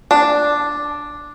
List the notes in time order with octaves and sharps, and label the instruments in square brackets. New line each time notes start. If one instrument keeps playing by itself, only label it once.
[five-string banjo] D4